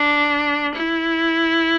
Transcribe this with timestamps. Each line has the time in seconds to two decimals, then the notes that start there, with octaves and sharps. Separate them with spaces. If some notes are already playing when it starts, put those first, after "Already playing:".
Already playing: D4
0.75 E4